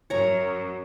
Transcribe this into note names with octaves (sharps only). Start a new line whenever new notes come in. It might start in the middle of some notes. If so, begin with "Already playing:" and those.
F#2 C#5 A#5